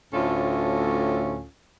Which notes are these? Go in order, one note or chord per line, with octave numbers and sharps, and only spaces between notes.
D2 A2 C#4 F4 A4